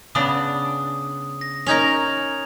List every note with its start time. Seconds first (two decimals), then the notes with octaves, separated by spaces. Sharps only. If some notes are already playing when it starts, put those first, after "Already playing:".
0.15 C#3 B3 D4 D#6
1.41 A#6
1.67 C#4 D#4 A#4 G6 G#6 F7